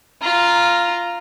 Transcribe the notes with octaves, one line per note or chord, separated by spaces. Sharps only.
F4 A#5